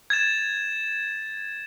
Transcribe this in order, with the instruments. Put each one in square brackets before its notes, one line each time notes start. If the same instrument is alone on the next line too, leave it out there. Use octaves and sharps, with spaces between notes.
[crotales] G#6 A6 E7